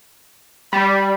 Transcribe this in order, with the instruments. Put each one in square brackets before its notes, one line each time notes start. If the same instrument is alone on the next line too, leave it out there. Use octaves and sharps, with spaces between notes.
[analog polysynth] G3 [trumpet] B5